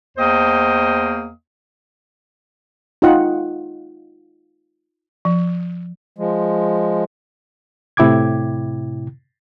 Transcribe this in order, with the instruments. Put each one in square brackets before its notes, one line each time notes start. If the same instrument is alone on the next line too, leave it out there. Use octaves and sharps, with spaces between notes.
[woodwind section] E2 A#3 C5 D#5 G5 D#6
[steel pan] D#4 F4 D#5 F#5 G5
[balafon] F3
[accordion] F3 G#3
[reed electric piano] A2 C3 E4 G5 D6 G#6